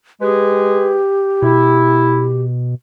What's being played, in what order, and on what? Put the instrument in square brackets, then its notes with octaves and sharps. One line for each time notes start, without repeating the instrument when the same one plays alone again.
[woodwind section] G#3 G#4 B4 [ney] G4
[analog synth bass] B2 [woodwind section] E4